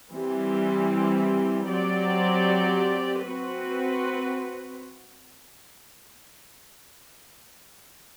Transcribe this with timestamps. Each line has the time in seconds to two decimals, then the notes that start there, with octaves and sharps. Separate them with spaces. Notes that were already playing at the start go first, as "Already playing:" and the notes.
0.12 E3 G3 C4 G4
1.67 F#3 C4 G4 D5
3.24 C4 F#4 B4